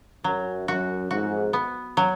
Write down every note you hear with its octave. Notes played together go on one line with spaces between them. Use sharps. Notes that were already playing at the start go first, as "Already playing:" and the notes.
F#2 F#3
F#2 F#4
F2 G#2 F#4
B3
F#3